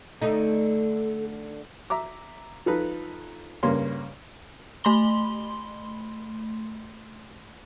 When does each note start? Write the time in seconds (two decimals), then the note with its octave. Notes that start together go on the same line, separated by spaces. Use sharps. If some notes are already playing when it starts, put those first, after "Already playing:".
0.22 D3 A3 D#4 A4
1.90 E5 A#5 D6
2.66 F3 D#4 A4 B4
3.63 G2 C#3 A#3 C#5 C6
4.84 A3 B5 C6 G7